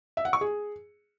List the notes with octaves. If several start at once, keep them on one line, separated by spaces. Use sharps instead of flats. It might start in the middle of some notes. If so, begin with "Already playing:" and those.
E5
F#5
C#6
G#4